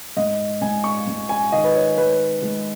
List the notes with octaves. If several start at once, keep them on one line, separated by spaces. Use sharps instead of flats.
G#2 D#5
G#2 G#5
C#6
G#2
G#5
D#3 D#5
B4
C#5
G#3 B4
G#3